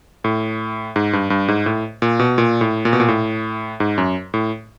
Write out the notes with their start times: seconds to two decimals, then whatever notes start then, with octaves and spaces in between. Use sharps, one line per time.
0.24 A2
0.96 G#2
1.13 G2
1.30 G2
1.48 G#2
1.66 A2
2.02 A#2
2.19 B2
2.38 A#2
2.61 A2
2.85 A#2
2.93 B2
3.00 A#2
3.08 A2
3.80 G#2
3.98 F#2
4.34 A2